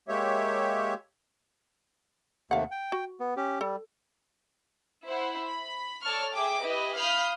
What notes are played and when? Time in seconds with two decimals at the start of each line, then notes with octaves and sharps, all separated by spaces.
0.08 G#3 A#3 G4 C#5 E5
2.51 D#2 C3 A3 F5 F#5
2.71 G5
2.92 F#4
3.20 B3
3.37 C#4 G4
3.61 G3 A4
5.08 E4 C5 F#5
5.46 B5
6.04 A4 C#5 D5 A5 C#6 F6
6.33 G#4 E5 G5 D6
6.63 E4 G4 B4 D#5
6.98 F5 B5 D#6 F6 G6